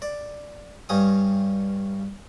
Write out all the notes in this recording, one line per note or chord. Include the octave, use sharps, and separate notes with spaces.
D5
G2 C#4 D#6